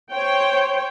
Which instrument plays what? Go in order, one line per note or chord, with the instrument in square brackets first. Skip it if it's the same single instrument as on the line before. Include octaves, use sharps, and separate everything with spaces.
[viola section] C5 C#5 G5